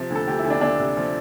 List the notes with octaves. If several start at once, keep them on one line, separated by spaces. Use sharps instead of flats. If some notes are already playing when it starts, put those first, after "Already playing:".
Already playing: C3 F3
D2
A4
D2 G4
E4
D2
D4
D2 D4
C3
F3